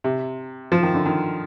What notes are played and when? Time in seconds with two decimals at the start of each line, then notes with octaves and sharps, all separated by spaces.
0.04 C3
0.72 F3
0.83 D#3
0.94 D3
1.06 D#3